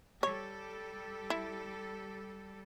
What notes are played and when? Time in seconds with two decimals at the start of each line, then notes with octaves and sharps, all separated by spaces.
0.23 G3 A4 C#5
1.30 E4